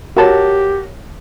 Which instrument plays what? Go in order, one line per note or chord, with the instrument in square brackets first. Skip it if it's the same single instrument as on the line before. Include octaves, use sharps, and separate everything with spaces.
[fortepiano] F#4 A5 [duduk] G4 [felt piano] A#4 C#5